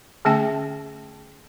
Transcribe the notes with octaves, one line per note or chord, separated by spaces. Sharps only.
D3 A3 C#4 G5 A5